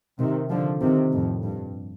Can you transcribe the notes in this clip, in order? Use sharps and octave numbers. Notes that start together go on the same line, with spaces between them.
C3 D#3
D3 F3
C3 D#3
F2 A2
G2